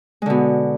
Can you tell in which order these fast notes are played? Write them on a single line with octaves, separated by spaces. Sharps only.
G#3 D3 B2